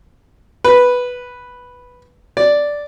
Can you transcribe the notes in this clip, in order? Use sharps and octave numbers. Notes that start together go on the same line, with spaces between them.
B4
D5